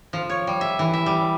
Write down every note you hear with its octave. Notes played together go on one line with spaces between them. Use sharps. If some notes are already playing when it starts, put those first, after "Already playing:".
F3
C#5
G3
E5
E3
E5
G3